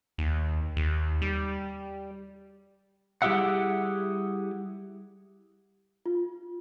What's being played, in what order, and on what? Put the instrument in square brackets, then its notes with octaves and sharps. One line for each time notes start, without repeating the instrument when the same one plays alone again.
[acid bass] D#2
D#2
G3
[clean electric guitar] G3 E4 G4 G#4 E5 F#5
[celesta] F4